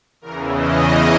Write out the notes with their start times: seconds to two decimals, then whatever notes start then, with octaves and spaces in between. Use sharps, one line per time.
0.21 E2 C#3 E3 A#4
0.54 D#5
0.85 D#5